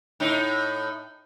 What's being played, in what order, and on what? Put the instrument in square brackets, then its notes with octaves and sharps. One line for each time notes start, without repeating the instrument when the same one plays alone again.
[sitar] A2 D#4